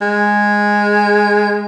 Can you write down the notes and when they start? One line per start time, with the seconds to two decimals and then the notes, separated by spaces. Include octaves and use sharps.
0.01 G#3